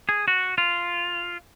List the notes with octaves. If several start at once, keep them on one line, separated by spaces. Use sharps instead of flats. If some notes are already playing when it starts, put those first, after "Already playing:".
G#4
F#4
F4